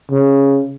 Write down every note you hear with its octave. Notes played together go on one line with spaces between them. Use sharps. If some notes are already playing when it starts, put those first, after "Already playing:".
C#3